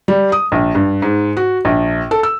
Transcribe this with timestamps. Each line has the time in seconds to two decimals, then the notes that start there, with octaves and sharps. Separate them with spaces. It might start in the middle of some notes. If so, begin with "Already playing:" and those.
0.08 G3
0.32 D#6
0.52 A#1
0.75 G2
1.02 G#2
1.37 F#4
1.65 A#1
2.11 A4
2.23 E6